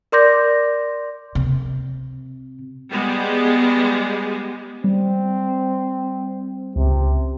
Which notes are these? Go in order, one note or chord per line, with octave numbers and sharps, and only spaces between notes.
A#4 D5 C6 D6 G6 A#6
C3
G3 G#3 B3
G3 C4
C#2 C3